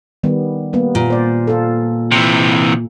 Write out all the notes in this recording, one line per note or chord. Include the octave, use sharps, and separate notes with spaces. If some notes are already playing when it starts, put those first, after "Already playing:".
D#3 G3 B3
G3 A#3 B3
A#2
C5 D5
F4 A4
C3 E3